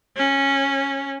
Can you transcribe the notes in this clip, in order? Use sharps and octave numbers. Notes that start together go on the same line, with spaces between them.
C#4